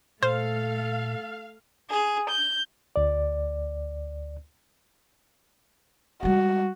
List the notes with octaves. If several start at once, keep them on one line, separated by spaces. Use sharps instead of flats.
A#2 A3 A4 C5 F5
G#4
G6
D2 D5
G3 G#3 F#4